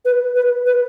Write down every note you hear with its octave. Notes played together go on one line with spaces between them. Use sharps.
B4
B4
B4